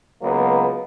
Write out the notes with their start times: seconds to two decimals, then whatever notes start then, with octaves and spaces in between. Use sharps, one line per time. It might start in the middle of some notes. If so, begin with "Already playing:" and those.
0.22 C#2 F#3 A#3 B3